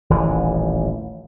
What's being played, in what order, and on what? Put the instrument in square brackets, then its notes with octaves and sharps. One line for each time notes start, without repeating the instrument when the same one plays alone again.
[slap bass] D#1 A1 E3